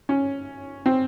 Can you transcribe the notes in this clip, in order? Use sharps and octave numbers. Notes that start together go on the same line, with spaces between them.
C#4
C4